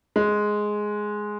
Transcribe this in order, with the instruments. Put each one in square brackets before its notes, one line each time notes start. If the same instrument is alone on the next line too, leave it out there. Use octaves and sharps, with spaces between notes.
[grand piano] G#3